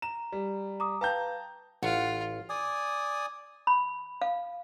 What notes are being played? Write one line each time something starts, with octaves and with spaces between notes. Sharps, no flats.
A#5 E7
G3
A#5 D6 D#6
B4 F5 G5 A5 A#5 G6
A1 F4 F#5
D5 G#5 D#6
B5
F5